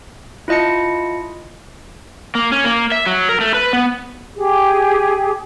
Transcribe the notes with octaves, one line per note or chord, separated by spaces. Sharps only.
E4 F4 D#5 A5 C#7
A#3
C#4
A#3
E5
F#3
A#4
A3
B4
B3
G4 G#4